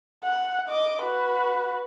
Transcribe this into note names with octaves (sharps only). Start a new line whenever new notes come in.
F#5
D#5 D6
F#4 B4